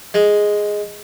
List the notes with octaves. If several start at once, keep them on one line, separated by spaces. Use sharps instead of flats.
G#3